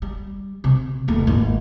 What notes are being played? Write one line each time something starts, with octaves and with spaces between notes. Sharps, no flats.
G3
C3
D#1 A3
G#1 A#2